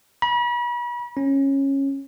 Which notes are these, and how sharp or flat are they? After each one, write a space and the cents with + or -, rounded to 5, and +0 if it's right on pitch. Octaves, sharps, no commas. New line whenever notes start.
B5 -40
C#4 -15